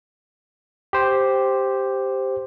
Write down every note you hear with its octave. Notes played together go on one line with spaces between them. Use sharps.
G4 C5